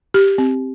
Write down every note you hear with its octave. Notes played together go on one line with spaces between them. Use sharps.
G4
C4